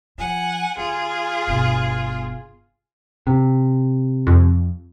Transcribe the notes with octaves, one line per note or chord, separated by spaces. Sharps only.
F3 F#5 G#5
D#2 F4 G#4
G1 B2
C3
F2